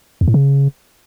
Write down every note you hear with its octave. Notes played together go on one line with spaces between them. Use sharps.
E2
A2
C#3